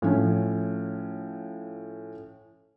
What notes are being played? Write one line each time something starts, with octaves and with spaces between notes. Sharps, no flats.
A2 F3 C#4